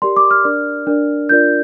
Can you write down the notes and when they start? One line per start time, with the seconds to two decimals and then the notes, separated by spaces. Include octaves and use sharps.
0.02 G4 A#4 D5 C6
0.17 D6
0.31 F6
0.44 D4 A#4 D5
0.87 D4 A#4 D5
1.29 D4 F4 A#4 D5 G6